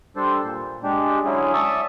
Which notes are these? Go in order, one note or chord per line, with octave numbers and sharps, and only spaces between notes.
G3 D4 A4 C5
A#2
G#3 D4 G4
D3 F#3 G#3 C#4 E4 G#4
D5 E5 A5 C#6 D#6 E6